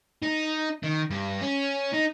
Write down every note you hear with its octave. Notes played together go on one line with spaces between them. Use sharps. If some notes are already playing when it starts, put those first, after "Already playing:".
D#4
D#3
G2
C#4
D#4